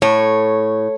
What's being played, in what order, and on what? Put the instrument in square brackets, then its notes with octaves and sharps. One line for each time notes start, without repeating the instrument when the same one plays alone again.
[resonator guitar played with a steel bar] A2 [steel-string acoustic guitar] C#5